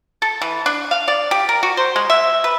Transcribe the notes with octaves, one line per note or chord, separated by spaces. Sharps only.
A4
E3
D4
F5
D5
G4
A#4
F#4
C5
G#3
E5
B4